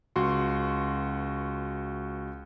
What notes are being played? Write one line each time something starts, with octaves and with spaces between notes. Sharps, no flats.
C#2 F#4 C6